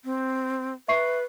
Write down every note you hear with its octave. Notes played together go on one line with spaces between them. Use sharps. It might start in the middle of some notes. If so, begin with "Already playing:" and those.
C4
B4 E5 C#6 C7